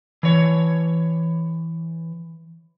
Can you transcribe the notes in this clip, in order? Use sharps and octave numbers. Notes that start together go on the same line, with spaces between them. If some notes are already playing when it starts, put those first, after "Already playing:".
E3 C#5